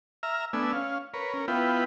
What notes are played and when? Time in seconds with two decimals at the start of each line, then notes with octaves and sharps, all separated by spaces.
0.23 E5 A#5 F6
0.53 A3 B3 D4 G#5 E6
0.73 C#4 F5
1.14 A#4 B4 C#5
1.34 C#4 A#4
1.48 B3 E4 F4 B4 G5